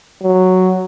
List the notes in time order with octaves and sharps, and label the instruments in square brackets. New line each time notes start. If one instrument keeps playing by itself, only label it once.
[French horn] F#3